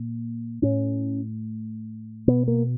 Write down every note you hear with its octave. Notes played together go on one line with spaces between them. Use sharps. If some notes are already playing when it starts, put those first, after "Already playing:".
Already playing: A#2
A2 C#4
B2 B3
A#3